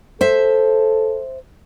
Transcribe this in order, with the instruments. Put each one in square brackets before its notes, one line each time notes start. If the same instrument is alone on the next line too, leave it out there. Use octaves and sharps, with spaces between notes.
[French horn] A4 [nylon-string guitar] C5 E5